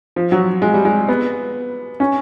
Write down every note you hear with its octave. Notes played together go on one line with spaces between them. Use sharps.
F3
F#3
G#3
G3
G#3
B3
C#4